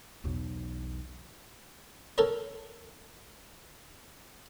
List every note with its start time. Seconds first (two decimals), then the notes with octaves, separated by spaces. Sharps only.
0.24 B1 E2
2.18 A4 A#4 C#5